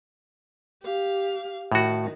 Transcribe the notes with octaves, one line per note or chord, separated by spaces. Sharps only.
G4 F5
A2 D#3 F#4